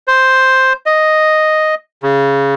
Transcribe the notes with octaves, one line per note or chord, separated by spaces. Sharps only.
C5
D#5
C#3